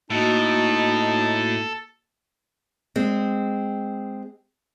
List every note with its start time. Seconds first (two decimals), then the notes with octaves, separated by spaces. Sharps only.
0.10 A2 A#3 D#4 F#4 A4
2.96 G#3 C4